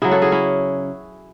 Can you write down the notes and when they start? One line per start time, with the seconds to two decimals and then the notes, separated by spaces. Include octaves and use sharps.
0.02 C#3 F#3 E4 G#4
0.11 F#4 A4
0.22 E4 G#4
0.32 C#4 E4